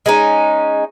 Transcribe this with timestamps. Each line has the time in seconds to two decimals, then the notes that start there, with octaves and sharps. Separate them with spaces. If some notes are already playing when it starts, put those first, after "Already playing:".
0.06 G#3 C#4 D#4